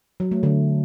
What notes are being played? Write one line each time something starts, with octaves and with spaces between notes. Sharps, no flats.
F#3
A3
D3